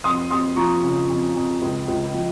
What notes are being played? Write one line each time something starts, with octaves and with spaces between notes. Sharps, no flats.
F2 C6 D#6
F2 C6 D#6
F3 A#5 C#6
C#3
F2
F2
C#2
C#2
F3